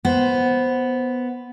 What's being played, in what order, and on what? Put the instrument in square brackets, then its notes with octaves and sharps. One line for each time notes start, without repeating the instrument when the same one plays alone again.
[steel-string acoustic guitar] B3 C5